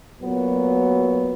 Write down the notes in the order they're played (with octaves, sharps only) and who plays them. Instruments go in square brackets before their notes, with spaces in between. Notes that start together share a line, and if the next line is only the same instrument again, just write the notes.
[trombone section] A#2 F#3 B3